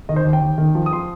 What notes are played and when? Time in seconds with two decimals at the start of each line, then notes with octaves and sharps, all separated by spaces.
0.09 D#3 D#5
0.16 C5
0.25 D#2
0.33 G5
0.42 D#2
0.58 D#3
0.75 F3
0.86 D#6
0.92 F3 C6